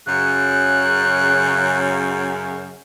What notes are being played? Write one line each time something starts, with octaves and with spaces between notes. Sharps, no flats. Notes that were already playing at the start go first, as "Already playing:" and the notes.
F#2 C#3 F#6